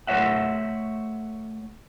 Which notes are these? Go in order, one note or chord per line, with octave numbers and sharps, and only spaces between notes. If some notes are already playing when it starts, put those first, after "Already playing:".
A3 C5 C#5 E5 F#5